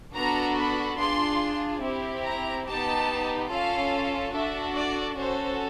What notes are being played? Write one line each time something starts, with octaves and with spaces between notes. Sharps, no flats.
B3 D4 F#4 A4 A#5
B5
D4 F4 G#4 C6
C4 E4 G4
A#5
B3 D#4 G4 A5
C#4 F4 A4 F5
D4 F#4 A4 E5
D5
C#4 F#4 A4 C5